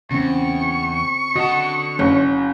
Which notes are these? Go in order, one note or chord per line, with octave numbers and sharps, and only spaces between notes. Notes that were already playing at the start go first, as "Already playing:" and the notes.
E2 C#3 C4 C#6
D3 F#4 D#5 A5
F#1 C#4